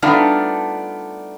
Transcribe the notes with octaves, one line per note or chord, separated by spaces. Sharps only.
G3 A3 B3 D4 D#4 F4